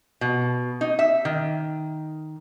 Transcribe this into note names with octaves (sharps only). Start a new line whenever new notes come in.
B2
D#4
E5
D#3